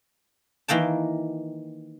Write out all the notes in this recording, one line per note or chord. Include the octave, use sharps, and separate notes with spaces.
D#3 E3 A#3 G5 A5